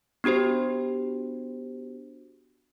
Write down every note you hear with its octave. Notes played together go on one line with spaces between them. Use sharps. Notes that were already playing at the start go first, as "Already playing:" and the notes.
B3 D4 F#4 G4 C5